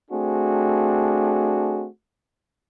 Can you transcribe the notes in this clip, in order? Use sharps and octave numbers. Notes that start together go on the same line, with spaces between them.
A3 C4 D4 F#4 G#4